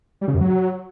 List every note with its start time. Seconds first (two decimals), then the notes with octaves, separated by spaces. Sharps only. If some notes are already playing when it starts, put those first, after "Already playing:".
0.21 G3
0.28 C#3
0.34 F#2
0.41 F#3